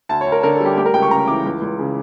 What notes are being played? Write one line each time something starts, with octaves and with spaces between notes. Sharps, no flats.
D2 A5
C#5
D2
A#4
D3 A#4
A4
G3
G4
A3 G4
A#4
C#2 G5
C#6
C#3 A#5
E3 D6
C#2
C#2
C#3